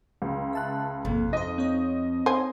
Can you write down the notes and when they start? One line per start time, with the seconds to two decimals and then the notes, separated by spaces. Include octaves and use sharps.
0.22 C#2
0.53 E5 A5 F#6
1.05 G#1 F2 C3 A#3
1.33 D#4 C5 D#5
1.58 C4 D#4 C#5
2.26 C5 G#5